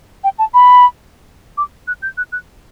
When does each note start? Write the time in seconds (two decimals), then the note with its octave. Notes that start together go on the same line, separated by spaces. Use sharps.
0.24 G5
0.38 A5
0.54 B5
1.57 D6
1.87 F#6
2.02 G6
2.17 F#6
2.32 F#6